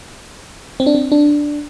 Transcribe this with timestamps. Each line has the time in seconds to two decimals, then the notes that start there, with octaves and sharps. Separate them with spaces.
0.80 C4
0.86 D4
0.95 C4
1.12 D4